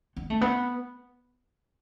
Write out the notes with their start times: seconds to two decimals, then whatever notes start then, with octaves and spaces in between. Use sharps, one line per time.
0.16 B3
0.30 A3
0.41 B3